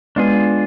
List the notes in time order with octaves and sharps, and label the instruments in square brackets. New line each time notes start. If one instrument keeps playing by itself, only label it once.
[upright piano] G#3 B3 [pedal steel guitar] D4 F4 G#4